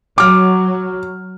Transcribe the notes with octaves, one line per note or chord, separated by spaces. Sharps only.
F#3 D6 F6